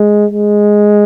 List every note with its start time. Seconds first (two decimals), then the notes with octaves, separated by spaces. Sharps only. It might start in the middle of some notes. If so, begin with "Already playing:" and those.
Already playing: G#3
0.31 G#3